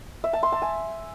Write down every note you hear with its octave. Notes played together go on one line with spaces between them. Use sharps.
E5
A5
C6
A5
G#5